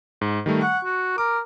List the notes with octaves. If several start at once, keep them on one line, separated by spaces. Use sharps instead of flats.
G#2
D#3 G3 A3
F#5 C#6
F#4
A#4 D6